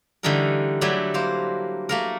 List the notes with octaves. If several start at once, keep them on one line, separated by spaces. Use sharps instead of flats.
D3 E3 G3 A3 D#4 A#4
F#3 G3 A3 D4 E4
A#3 C5
A3 A#3 A#4